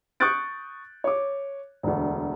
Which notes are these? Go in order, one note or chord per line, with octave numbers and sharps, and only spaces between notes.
C#6 D#6 F#6 G6 A6 D7
C#5 D6
E1 D2